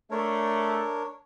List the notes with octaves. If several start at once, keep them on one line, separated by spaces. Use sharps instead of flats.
A3 D4 A#4 C#5